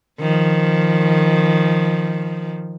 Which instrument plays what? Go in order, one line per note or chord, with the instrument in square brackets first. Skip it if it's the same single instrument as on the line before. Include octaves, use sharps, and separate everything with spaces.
[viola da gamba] D#3 F3